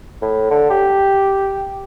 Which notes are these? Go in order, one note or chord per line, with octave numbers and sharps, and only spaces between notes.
A2
D3
G4